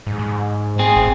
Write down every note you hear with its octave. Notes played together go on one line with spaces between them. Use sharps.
G#2
G#2
C4 G#4
A1